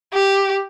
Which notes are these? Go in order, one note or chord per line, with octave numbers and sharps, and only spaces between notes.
G4